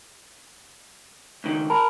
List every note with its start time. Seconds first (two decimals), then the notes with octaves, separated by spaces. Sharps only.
1.44 C#2 D#3
1.70 A#4 A5 B5